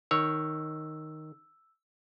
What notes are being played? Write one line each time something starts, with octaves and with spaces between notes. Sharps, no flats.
D#3 C#5 E6